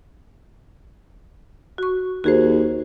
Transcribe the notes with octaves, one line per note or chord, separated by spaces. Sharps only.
F#4 C#6
D#2 F#4 G#4 C5